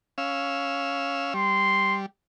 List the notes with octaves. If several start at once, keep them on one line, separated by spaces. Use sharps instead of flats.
C#4 F5 E6
G3 C6